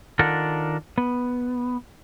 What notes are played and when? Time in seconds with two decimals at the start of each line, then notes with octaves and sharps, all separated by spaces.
0.19 D#3 D4 F4 A4 A#4 F#5
0.98 B3